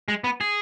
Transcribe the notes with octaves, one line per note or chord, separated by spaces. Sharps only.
G#3
B3
G#4